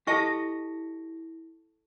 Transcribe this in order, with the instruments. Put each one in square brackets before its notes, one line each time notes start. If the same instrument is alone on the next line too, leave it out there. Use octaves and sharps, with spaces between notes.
[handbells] E4 A#6 C#7 [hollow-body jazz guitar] G4 D#5 [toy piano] A4 A5 C#6